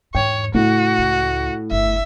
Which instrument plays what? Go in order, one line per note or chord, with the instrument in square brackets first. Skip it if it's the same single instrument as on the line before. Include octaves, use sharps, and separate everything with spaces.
[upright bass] E2 G#2 [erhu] C#5 [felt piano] G5
[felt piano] A2 [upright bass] C#3 [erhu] F#4
[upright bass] C#2 G#3
[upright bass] G1 F2 [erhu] E5